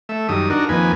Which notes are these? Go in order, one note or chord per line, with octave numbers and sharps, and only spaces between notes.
A3 E5
F#2 D#3 G3 D#6
D4 D#4 F#4 A#4
F2 D#3 A#3 B4 G#5